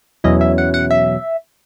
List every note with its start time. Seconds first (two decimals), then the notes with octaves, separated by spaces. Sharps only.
0.24 E2 B2 F#3 C#4 E4 D#5
0.41 E5
0.58 F#5
0.74 F#5
0.91 E5